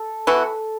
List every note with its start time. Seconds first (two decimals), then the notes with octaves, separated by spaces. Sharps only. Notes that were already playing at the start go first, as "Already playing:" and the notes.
Already playing: A4
0.27 E3 B3 F#4